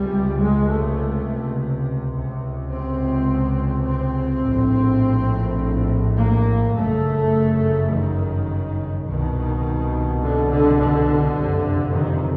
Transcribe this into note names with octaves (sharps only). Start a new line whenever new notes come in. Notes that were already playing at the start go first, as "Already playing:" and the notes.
Already playing: C#2 C3 G3
G#3
A3
C#2 C3
C4
C4
A#1 A2
A#3
G1 F#2 C#3 A3
D#3
C2 B2 D#3
D3
D3
D3
F#1 F2 C3
D#3